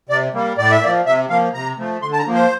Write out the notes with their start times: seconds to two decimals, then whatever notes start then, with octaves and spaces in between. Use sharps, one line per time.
0.09 C3 D5
0.34 G3 A#3
0.58 A2 D5
0.71 E5
0.81 F3 A#3 D5
1.06 C3 E5
1.29 F3 A#3 F5
1.54 C3 A#5
1.78 F3 A3
2.02 D3 C6
2.13 A5
2.19 A#5
2.26 F3 A#3
2.35 C5